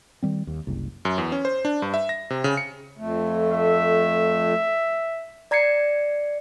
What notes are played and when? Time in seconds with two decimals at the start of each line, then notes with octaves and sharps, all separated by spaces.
0.23 D#3 G3 C4
0.47 D#2
0.67 F#1 C2
1.05 F#2
1.18 E2
1.32 C#4
1.45 C5
1.65 D4
1.82 G2
1.94 E5
2.09 A#6
2.30 C3
2.44 C#3
2.57 C#7
2.98 F2 A3
3.52 E5
5.51 D5 A#5 G#6 C7 C#7